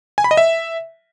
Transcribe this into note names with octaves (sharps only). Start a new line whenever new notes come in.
G#5
B5
D#5
E5